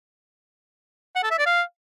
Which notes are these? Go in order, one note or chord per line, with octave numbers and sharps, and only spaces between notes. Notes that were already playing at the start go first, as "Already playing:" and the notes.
F#5
A4
E5
D5
F5